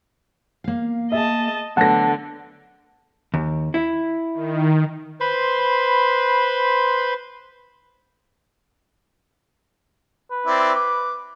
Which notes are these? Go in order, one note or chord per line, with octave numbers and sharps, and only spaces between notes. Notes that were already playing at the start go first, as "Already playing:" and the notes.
A#3 F5
G#4 D#5 E5 A5
D3 F#3 A3 B3 F#5 A5 A#6
D#2
E4
D#3
B4 C5 B5 C6
B4
C4 E4 D5
D6